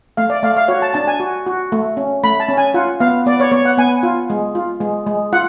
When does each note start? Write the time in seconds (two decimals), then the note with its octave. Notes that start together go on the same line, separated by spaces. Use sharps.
0.17 A3 F5
0.30 D5
0.43 A3 F5
0.56 F5
0.68 F#4 C#5
0.82 A5
0.94 D4 A5
1.07 G#5
1.20 F#4
1.47 F#4
1.72 A3
1.97 C#4
2.24 A3 B5
2.40 A5
2.48 C#4
2.57 G#5
2.74 F4 F#5
3.00 B3 F5
3.26 B3 D5
3.40 C#5
3.52 B3 C#5
3.65 F#5
3.78 B3 G#5
4.03 F4
4.30 G#3
4.55 F4
4.81 G#3
5.07 G#3
5.33 F4 F#5